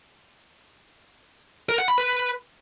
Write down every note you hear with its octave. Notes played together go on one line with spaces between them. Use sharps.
A#4
F#5
B5
B4